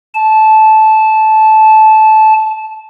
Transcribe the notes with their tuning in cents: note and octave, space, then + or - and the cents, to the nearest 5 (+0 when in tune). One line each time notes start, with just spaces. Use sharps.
A5 -15